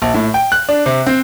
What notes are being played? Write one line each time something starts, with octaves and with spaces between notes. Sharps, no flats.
A#1
A2
G5
F#6
D4
C3
C4